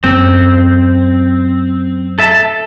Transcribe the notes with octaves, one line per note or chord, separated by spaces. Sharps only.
F#2 C4
A4 E5 A5